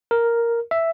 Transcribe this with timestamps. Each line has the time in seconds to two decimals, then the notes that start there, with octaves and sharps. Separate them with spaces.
0.11 A#4
0.71 E5